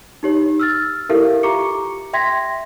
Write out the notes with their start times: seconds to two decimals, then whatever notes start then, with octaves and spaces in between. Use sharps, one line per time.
0.23 D#4 G4 C#5
0.60 E6 F6 A6
1.09 E4 G4 A4 A#4 E5 F5
1.43 F4 G4 A#5 C#6 D6 C#7
2.13 E5 G5 C6 G#6 A#6 B6